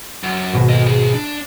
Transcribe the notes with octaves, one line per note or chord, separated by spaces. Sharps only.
F#2
G#1 B2
A4 D#5
C#2 G#4
D4